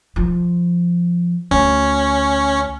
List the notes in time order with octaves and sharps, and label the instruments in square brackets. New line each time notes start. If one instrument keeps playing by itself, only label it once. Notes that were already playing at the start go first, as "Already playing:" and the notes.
[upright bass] F3
[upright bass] D2 [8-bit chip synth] C#4